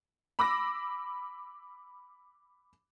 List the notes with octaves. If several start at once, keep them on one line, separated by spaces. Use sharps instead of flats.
B5 D6 E6 A#6